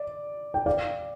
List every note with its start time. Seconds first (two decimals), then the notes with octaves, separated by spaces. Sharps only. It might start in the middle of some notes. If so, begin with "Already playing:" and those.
Already playing: D5
0.54 G5
0.66 D5 F5